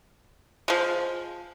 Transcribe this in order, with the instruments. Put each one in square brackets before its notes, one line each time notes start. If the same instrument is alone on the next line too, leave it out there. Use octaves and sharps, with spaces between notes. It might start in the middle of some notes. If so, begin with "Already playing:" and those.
[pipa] F3 G#3